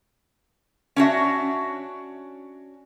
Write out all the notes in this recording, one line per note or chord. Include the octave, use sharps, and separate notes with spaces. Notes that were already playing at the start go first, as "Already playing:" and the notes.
C#4 D4 F#4 E5